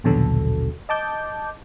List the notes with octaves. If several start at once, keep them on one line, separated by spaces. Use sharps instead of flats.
A#1 D#2 B2 D3 F#3 A4
D#5 A5 D6 G6